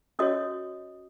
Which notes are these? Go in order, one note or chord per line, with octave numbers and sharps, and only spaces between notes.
C#4 F#4 C#5 D#5 D#6